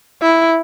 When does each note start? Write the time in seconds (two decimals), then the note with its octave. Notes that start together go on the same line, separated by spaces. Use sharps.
0.22 E4